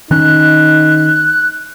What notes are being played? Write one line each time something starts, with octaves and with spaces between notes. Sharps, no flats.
D#3 C#4 D#4 F#6